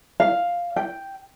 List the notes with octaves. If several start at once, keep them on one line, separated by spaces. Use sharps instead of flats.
F5
G5